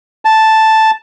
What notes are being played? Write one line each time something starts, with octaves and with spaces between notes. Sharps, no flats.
A5